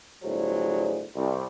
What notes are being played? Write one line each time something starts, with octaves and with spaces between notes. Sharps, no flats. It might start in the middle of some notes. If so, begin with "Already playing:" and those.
G1 A2 F#3 G#4 C5 D5
C2